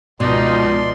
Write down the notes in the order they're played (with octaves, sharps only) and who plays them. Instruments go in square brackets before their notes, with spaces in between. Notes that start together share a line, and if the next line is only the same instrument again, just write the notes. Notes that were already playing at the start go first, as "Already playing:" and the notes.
[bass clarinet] C#2 [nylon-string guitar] B2 [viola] F3 D#4 [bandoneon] D5 C6